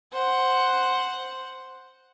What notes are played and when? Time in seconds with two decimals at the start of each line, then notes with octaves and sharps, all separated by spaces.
0.13 C5 F#5